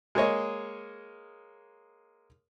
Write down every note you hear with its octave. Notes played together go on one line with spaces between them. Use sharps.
G#3 A#3 C#5 D#5